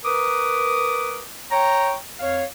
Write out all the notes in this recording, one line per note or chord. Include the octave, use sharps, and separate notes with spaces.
A#4 B4 D6 D#6
C#5 G5 A#5
F2 C#5 F5